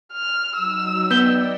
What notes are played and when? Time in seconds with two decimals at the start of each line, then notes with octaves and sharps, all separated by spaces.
0.12 F6
0.56 F#3 D#4 E6
1.11 B3 D5 D#5 G5 G6 G7